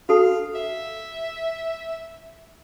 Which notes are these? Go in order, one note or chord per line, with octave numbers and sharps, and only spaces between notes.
F#4 A4 F5
E5